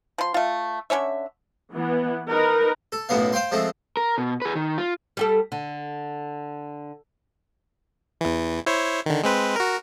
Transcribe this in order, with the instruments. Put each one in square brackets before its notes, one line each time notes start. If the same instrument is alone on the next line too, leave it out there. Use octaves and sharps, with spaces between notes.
[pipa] F3 C6
A3 F4
D3 C#4 C#5 E5
[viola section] E3 B3
D#4 A#4 B4
[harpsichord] A4
B1 F#2 A2 F#3 B3 F5
C5 F5 G5 C6
F3 G#3 A3 C4
[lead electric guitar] A#4
B2
G#4 B4
D#3
F4
[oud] G3 G4 A4
D3
[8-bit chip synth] E2 E3
E4 C5 C#5
D3 D#3
G#3 C4 B4
F#4 A#4